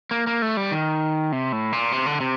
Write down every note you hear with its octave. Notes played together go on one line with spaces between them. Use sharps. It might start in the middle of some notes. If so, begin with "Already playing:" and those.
A#3
A#3
A3
G3
D#3
C3
A2
A#2
C3
D3
C3